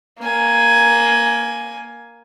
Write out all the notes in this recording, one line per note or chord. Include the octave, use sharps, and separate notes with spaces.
A#3 G#5